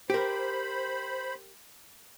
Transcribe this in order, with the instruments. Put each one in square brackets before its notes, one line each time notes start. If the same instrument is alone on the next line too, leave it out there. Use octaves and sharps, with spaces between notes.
[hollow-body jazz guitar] G4 A#4 [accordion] C5 B5